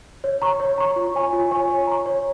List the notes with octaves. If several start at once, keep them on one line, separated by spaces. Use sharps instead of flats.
C#5
A#5 C#6
C#5
A#5 C#6
F4
C#5 G#5 C#6
F4
C#5 G#5 C#6
C#5
A#5 C#6
C#5